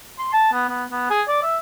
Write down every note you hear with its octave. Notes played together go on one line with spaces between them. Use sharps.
C6
A5
B3
B3
B3
G#4
D5
E5